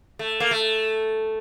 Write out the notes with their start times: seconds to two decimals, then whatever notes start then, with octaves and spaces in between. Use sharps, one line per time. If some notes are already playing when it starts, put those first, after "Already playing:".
0.19 A3
0.40 A#3
0.51 A3